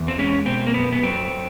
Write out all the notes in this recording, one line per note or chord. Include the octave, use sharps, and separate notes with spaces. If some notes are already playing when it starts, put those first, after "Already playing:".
Already playing: E2
C4
G#3 C#4
B2 C4
A#3
F#2 B3
B3
F#3 C4